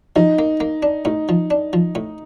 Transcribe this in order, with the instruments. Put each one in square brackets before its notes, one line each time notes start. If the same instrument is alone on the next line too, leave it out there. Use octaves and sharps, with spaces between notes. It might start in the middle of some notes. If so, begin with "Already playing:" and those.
[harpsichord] F3 [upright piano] D#4
[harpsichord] A#3
A#3
D4
[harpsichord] A2 [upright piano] D#4
[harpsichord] F3
D4
F3
A2